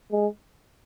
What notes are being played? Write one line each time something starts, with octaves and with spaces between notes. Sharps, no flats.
G#3